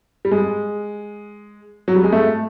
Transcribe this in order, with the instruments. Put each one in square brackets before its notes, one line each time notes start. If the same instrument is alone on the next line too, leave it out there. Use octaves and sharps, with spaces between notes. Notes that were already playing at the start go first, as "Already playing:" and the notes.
[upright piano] G3
G#3
F#3
G3
G#3
A3